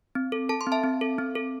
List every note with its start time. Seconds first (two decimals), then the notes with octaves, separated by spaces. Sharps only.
0.15 C4
0.32 A4
0.49 A4 A5
0.61 C6
0.67 C4
0.72 E5 A5
0.84 C4
1.01 A4
1.19 C4
1.35 A4